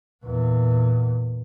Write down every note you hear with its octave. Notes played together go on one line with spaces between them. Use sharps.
E2 A#2